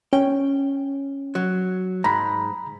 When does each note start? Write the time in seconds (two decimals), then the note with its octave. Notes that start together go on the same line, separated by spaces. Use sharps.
0.13 C#4 G5
1.35 F#3
2.04 G#2 A#5 B5